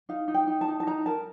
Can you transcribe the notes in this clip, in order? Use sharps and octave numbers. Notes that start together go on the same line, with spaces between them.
D#4 F5
D#4
G5
D#4
A5
D#4
A5
D#4 A#5
A#4 A5